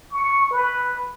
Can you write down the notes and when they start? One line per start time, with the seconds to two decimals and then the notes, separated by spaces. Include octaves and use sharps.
0.11 C#6
0.51 B4